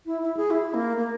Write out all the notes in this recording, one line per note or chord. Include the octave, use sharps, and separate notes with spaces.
E4
E4
G#4
E4
A#3
A#3